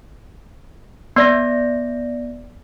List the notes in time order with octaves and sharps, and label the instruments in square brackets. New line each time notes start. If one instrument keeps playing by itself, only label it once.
[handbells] B3 D5 A#6